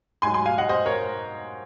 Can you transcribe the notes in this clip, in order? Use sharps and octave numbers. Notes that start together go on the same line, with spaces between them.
G#2 F#3 G#5 C6
G#5 C6
F5 G#5
D#5 F#5
C5 D#5
A#4 C#5